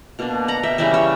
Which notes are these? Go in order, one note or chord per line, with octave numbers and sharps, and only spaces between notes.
B2 A#3 D4
F#5 A#5
E5 G5
C#3 E3 G3 C#4 E5 G5
C#5 E5